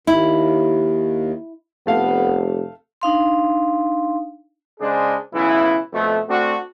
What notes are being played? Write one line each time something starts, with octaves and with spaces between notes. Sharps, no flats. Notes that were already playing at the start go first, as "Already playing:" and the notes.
D#2 E4
F1 A3 B3 F5
D4 D#4 F5 C6
C#3 G#3 D4 G#4 C5
B1 C#3 E3 E4
F2 B2 A3
A3 C4 D4 F#4